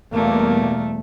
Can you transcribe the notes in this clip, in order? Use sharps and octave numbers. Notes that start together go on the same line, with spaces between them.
E2 B2 G3 A3 A#3